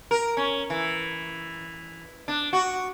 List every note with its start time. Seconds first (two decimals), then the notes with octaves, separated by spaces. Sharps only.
0.11 A#4
0.37 C#4
0.70 E3
2.28 D4
2.53 F#4